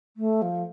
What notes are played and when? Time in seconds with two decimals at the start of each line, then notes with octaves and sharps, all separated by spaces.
0.17 A3
0.42 F3